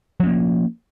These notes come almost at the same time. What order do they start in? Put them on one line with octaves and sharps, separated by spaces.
F3 C#4 A#3